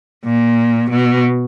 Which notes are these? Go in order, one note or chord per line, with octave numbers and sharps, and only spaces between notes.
A#2
B2